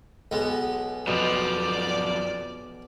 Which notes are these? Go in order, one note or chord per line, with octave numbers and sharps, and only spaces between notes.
B1 G#3 B3
F#2 B2 F3 D5